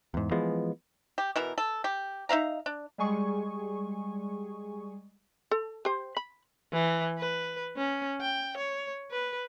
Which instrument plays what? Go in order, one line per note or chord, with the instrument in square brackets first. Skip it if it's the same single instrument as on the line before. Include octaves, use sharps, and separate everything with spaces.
[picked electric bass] E2 G#2
E3 F3 G#3 B3
[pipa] G4
B2 E3 A#4
A4
G4
D#4 E5 F5 A#5
D4
[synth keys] G3 G#3 G#4 G#5 C#6
[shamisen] A4
G4 C5
B5
[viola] E3
B4
C#4
G5
C#5
B4